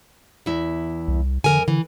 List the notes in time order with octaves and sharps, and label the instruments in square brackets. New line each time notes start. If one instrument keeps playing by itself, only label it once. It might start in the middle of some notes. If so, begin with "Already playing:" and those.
[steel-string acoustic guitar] E2 E4
[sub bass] C2
[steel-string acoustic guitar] F2 A#4 G#5 [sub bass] D3
[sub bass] D3 [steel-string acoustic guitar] E3